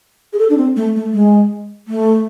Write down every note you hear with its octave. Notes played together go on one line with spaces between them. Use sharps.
G#4
A4
D4
C4
A3
A3
G#3
A3